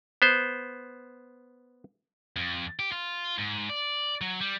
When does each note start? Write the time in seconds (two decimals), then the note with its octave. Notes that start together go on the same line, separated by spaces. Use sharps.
0.22 B3 C5
2.36 F2
2.79 G4
2.92 F4
3.38 G#2
3.69 D5
4.21 F#3
4.41 G3